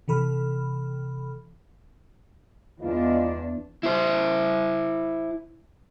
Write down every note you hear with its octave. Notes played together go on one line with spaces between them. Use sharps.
C3 E3 A4 B5 F6
E2 G#3 D4 D#4 F4
E4 C5